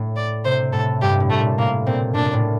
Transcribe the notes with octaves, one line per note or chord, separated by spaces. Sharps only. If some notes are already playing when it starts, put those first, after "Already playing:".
Already playing: A2
D5
C3 C5
A2 A4
G2 G4
A2
A3
A#2
A2 A#3
A#2 C4
A#2 D4
A#2
A2